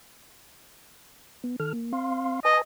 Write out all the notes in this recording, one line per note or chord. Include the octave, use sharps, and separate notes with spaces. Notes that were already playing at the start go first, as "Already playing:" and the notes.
B3
D#3 A4 F6
A#3
C4 F5 C6
B4 D#5 G#5 A5